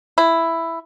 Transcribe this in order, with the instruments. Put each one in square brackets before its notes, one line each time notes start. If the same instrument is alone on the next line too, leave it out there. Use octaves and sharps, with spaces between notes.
[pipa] E4